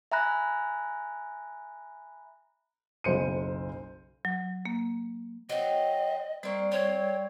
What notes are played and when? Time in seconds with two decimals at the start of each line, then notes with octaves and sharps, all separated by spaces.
0.12 E5 G#5 A#5 B5 F#6 A#6
3.04 F#1 B1 C5 C#7 D#7
4.25 F#3
4.65 A#3
5.49 F#3 C4 D#5
6.43 G3 A#3 C4 D5 C#6
6.72 C4 C#5